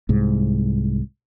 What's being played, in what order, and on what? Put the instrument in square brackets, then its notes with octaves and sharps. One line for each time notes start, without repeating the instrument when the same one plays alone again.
[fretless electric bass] C2 G#2